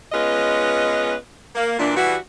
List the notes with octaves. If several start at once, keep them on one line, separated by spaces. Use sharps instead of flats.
G#3 B3 C#4 F4 B4 D#5
A#3
A#2 E3 D4
E3 G3 F#4